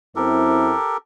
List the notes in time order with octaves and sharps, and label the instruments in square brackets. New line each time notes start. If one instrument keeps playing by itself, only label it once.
[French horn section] F#2 C4 E4 [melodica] G4 A4 A#4